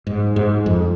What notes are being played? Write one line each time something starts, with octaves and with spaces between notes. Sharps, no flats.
G#2
G#2
F2